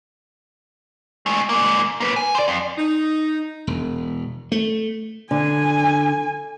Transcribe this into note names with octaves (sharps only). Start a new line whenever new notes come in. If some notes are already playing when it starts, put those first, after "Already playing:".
G#3 A3
G#3 A#3
A#3 B4
G#5
C5 D5
F2
D#4
E1
A3
D3 G#5